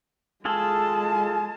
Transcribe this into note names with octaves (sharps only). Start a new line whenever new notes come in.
G#3 F4 G#4 A4 A5